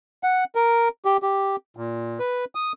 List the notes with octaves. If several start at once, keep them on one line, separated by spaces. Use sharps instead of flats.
F#5
A#4
G4
G4
A#2
B4
D#6